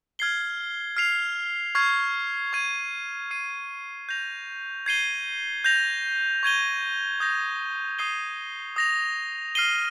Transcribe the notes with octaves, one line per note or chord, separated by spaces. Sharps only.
F6 G#6 C7 G7
F6 C7 F7
C#6 F6 G#6 C7
C#6 G#6 D#7
F6 C7 D#7
G6 A#6 F7
G#6 C7 D#7 G7
G6 A#6 F7
C#6 G#6 D#7 G7
D#6 G6 A#6
D#6 G6 C7 D#7 G7
D#6 A#6 F7
F6 C7 D#7 G7